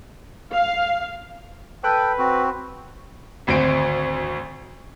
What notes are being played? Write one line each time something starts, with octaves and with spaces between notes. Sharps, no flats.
F5
A4 B4 G5
C4 F#4
G#1 D2 C4 D7